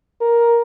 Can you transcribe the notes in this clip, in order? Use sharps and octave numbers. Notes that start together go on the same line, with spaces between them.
A#4